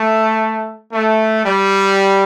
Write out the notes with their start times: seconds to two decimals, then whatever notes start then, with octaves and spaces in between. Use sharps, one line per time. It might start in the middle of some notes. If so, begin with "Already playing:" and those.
Already playing: A3
0.93 A3
1.46 G3